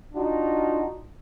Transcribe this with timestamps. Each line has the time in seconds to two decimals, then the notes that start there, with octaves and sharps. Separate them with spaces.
0.14 D4 D#4 F4 F#4